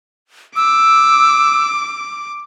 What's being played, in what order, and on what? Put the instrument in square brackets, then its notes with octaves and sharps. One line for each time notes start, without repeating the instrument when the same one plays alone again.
[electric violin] D6 [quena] E6